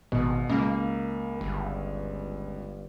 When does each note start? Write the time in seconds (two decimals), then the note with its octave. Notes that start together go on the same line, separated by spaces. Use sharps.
0.12 G#1 B2
0.49 C#2 A#3
1.41 G1